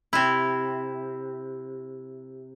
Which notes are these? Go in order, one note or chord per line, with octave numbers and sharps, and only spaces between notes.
C3 E4